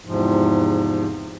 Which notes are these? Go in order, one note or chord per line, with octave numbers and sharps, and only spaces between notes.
E2 G#2 C3 F3